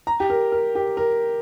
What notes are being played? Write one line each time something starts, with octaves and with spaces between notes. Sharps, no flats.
A#5
G4
A#4
A#4
G4
A#4